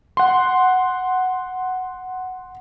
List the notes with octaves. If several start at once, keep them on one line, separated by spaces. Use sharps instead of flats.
F#5 C6